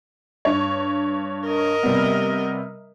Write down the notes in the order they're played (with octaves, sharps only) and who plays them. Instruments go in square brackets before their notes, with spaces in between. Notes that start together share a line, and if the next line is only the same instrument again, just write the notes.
[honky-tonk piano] G2 C#5
[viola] A#4 D#5
[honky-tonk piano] C3 G3 B3